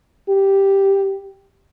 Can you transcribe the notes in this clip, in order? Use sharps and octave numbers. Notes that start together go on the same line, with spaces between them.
G4